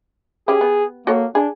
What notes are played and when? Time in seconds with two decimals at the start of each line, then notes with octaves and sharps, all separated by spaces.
0.48 C#4 G4 G#4
0.61 B3
1.07 A#3 F#4 A4 C#5
1.35 D4 G#4